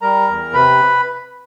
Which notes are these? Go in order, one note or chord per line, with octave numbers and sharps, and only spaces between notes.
G3 A#4 A#5
E2
C3 B4 B5